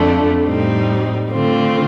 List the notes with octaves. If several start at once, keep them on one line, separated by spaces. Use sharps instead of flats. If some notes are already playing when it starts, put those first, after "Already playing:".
Already playing: F2 D3 A3 D4
A2 G3 C4 D#4
D3 A3 C4 F4